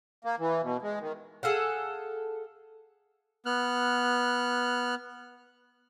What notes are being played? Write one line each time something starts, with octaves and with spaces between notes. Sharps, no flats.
A#3
E3
B2
G#3
D#3
G#4 A4 F5 F#5
B3 F6 F#6